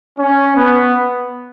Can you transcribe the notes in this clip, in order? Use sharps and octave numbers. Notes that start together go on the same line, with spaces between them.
C#4
B3